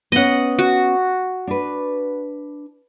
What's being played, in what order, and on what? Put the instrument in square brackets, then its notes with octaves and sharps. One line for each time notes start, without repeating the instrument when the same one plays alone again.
[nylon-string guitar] B3 C#4 [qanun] D#5 F#5
[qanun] F#4
[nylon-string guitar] D4 B4